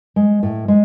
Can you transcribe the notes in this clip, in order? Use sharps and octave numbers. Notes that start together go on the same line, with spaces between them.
G#3
A2
G#3